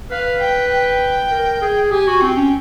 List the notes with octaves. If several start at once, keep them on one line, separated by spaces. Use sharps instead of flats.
B4 F5
G5
G5
A#4
G#4
G4 G#5
F#4
C4 G5
C#4